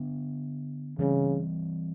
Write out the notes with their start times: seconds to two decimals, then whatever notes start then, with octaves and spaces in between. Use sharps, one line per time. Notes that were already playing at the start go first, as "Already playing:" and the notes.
Already playing: D3 B3 D4
0.99 C#3 E3 G3 C4